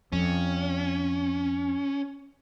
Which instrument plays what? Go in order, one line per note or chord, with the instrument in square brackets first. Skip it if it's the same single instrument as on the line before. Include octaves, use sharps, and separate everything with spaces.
[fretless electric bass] F2 [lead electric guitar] C#4